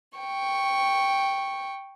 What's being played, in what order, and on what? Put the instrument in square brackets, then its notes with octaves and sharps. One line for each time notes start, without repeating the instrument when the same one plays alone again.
[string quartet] G5 C#6